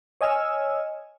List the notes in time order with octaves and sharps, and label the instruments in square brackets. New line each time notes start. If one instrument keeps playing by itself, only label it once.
[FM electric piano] C#5 D#5 G#5 E6 F6